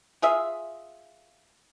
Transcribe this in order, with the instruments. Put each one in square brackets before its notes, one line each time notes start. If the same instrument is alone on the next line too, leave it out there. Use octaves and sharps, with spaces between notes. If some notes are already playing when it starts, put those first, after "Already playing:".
[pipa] F4 G#4 E5